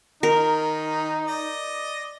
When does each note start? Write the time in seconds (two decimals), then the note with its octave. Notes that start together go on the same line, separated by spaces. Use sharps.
0.23 D#3 D#4 A#4
1.27 D5 D#5